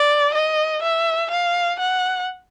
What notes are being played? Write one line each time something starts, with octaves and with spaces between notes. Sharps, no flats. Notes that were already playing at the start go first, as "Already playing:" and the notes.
Already playing: D5
D#5
E5
F5
F#5